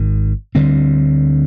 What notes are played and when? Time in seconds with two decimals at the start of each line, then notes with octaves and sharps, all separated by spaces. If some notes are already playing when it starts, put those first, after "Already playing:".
Already playing: G#1 G#2 D#3
0.55 D2 D3 G3 C4